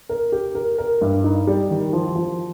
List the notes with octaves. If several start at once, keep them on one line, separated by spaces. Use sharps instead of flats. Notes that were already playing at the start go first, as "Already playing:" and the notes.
A#4
G4
A#4
A#4
G2
D#4
G3
D#3
F3
F3